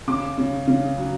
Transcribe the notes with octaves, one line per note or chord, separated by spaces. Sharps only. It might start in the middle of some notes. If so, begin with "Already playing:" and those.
C#3 D6
C#3
C#3
F#3